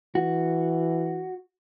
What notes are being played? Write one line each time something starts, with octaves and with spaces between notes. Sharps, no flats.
E3 F#4